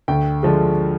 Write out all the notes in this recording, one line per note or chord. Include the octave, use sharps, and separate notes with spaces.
D2 G5
D3 F3 G#3